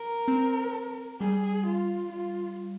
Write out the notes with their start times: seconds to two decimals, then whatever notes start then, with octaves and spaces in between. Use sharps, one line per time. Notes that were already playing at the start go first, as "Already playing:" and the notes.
Already playing: A#4
0.28 C4
1.21 G3 G#4
1.66 F4
2.13 F4